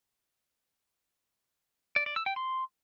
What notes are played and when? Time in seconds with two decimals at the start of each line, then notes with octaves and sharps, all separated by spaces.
1.96 D5
2.06 D5
2.16 E6
2.26 G5
2.36 C6